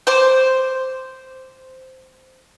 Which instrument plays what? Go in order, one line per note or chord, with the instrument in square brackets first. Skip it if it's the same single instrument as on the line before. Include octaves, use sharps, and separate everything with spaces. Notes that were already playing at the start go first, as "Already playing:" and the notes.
[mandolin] C5 D6